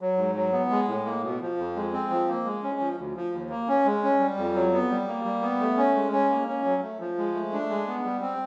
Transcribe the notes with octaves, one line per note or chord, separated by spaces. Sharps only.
F#3
G#2
F#3
B3
G#3
A2
A#3
B2
F3
F2
G#3
C4
F3
A#3
G#3
C#4
F3
D2
F3
D#2
A#3
C#4
G#3
C#4
G3
F2
F#3
B3
G3
A#3
G3
B3
A3
C#4
G#3
C#4
A#3
C#4
F#3
A3
F3
G#3
A3
D4
G#3
B3
G3
C4